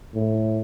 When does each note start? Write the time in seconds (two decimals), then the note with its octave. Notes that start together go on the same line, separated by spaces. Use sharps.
0.14 A2